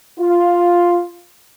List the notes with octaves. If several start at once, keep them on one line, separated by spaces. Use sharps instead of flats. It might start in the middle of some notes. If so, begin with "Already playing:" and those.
F4